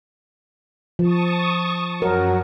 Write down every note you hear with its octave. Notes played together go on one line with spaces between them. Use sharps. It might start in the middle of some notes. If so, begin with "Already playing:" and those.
F3 A5 C#6 D#6
F#2 F#3 A#4